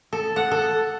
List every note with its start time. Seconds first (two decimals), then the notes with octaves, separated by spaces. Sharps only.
0.13 A4
0.36 F#5
0.51 A4